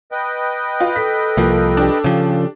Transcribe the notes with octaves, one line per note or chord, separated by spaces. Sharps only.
B4 D#5 G5
F4
A4 B6
C2 F3 A#3
D4 G4
C#3 F3